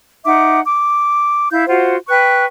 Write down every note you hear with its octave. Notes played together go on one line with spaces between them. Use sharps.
D#4 E5 F#5 D6
D6
E4 F5 G6
F4 F#4 C5 F#5
B4 G5 C#6 F#6